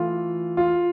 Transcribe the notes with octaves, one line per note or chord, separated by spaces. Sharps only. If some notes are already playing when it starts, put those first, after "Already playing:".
Already playing: E3 A3 F4
F4